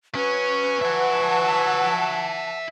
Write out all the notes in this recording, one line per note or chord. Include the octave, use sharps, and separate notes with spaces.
F#3 C#4 B4 C#6
E5 F#5 G#5 A5